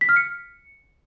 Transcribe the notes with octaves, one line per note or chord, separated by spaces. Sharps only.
B6
F6
C#7